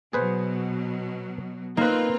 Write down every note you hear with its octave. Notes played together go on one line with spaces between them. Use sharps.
B2 F#3 G#4 B4 C5
A#3 C4 D#4 F4 B4